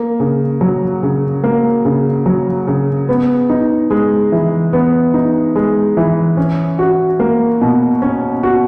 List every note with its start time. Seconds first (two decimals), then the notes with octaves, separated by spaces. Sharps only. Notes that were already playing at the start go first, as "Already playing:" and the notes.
Already playing: A#3
0.20 C#3
0.61 F#3
1.03 C#3
1.44 A#3
1.85 C#3
2.26 F#3
2.67 C#3
3.09 B3
3.50 D#4
3.90 G#3
4.32 E3
4.73 B3
5.14 D#4
5.56 G#3
5.97 E3
6.37 C#4
6.79 F#4
7.20 A#3
7.62 B2
8.02 C#4
8.43 F#4